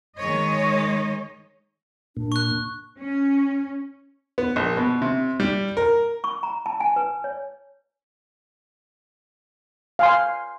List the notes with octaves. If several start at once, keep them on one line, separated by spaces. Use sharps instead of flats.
D#3 G#3 C#5 D#5
A#2 D4
C#6 F#6
C#4
B3
A#1
B2
C3
G3
A#4
C#6
A#5
A5
G#5
B4
C#5
F5 G#5 C6